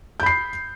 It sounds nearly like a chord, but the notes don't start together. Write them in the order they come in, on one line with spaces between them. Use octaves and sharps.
G6 B5 C7